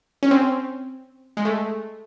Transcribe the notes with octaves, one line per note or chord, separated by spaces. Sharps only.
C#4
C4
G#3
A3